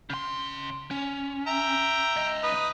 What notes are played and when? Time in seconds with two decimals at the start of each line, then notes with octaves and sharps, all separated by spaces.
0.10 C#3 C6
0.91 C#4
1.47 E5 G5 A#5
2.16 C#2 D#5
2.43 D#4 B4 D#6